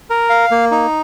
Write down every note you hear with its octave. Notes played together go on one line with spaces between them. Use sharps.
A#4
F5
A#3
D#4